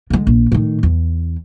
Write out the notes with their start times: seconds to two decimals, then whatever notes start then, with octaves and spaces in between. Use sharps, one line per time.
0.10 D3 G#3
0.27 A#1
0.52 A2 D#3
0.83 E2